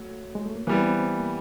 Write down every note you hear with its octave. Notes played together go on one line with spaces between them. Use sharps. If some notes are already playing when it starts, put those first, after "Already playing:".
Already playing: F#3 A3
G#3
A3
A#3
E3 G3 A#3 B3
C4
C4
C4
A#3